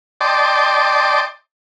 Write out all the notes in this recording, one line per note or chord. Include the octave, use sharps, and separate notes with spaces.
D5 D#5 G5 A5 C6 D6